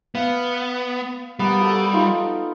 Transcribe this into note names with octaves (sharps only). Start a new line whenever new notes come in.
B3 F5 G5
G3 B3 A#4 F#5
F#4 A4 E6
D#4 F4 G5